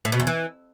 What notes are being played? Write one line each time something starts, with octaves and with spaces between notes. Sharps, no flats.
A2
B2
E2
E3